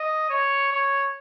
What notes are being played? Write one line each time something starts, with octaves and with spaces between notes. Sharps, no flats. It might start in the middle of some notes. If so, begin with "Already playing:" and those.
Already playing: D#5
C#5
C#5